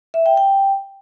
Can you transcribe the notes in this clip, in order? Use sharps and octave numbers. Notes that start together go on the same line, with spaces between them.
E5
G5
G5